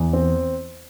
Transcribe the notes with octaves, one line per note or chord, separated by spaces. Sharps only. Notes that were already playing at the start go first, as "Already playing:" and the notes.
Already playing: E2
C4